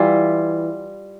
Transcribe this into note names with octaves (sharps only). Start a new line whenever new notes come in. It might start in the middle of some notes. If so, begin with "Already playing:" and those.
Already playing: E3 G3 E4 F4